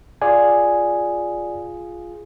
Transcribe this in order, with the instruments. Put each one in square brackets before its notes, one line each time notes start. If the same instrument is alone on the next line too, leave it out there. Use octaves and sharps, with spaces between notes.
[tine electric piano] F4 G#4 [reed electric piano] D5 G#5